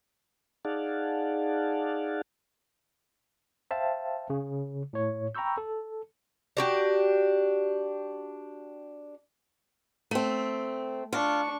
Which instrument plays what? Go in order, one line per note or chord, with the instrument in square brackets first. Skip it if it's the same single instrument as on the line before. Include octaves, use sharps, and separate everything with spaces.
[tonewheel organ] D#4 G#4 D5 F5 F#5 A5
[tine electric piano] C5 E5 F5 G5 A5
C#3
A2 C#5
G5 A#5 B5 C#6 E6 G6
A4
[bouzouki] D4 F#4 G4
[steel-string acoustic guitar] A3 C4
[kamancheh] D4 C#6 [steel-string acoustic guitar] F4